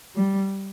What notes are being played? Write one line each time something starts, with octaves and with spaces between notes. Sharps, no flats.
G3